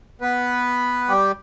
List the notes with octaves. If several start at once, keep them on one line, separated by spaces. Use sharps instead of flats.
B3 B4
G3 G4